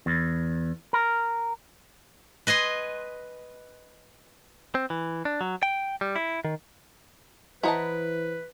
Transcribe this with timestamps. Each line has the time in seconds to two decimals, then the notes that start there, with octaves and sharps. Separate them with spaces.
0.06 E2
0.93 A#4
2.47 B4 D#5 G#5 C6
4.75 C4
4.90 E3
5.25 D4
5.41 F#3
5.63 G5
6.01 G3
6.16 E4
6.45 D#3
7.63 E3 E4 B4 C5 D#5 F#5 A5 A#5